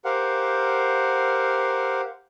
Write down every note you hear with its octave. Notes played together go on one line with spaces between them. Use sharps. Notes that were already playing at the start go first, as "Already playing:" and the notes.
G4 A#4 C5 F5 F#5